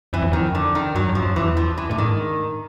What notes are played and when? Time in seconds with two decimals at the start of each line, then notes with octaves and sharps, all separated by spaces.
0.13 F2 E3
0.22 E2
0.32 F2 D#3
0.55 D3
0.75 D#3
0.95 F#2 F#3
1.09 F#2
1.15 F3
1.23 F#2
1.36 E2 E3
1.57 F3
1.78 E3
1.89 A2 D3
1.98 G#2 D#3